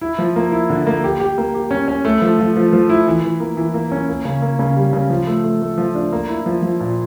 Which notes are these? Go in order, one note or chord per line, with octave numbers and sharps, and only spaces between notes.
E4
F3
A#3
E4
D3
A#3
G4
G4
A#3
G4
C#4
C#4
A3
F3
F3
F3
F3
E4
E3
E3
A#3
E3
A#3
C#4
A#3
C#3
A#3
C#3
G3
C#3
F3
A3
A3
A3
F3
D4
A#3
E4
F3
F3
A#2